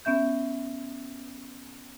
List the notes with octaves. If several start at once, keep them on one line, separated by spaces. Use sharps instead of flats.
B3 C#4 E5 G6